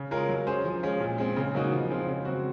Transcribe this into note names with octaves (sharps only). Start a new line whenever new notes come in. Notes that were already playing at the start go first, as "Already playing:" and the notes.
Already playing: C#3
G#3 C#4 F4 A#4
F#3
C#4 G#4 C5
F3
G#3 C#4 F4
A#2
G#3 C4
C#3
F#3 A#3 D#4 F#4
F3
G#3 C4 F4
C#3
F#3 C4 F#4